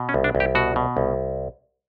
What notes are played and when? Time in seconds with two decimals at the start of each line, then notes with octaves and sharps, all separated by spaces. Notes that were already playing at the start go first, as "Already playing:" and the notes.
Already playing: B2
0.09 C#4
0.14 C2
0.24 D4
0.35 C2
0.40 G4
0.55 B2 F#4
0.76 B2
0.97 C2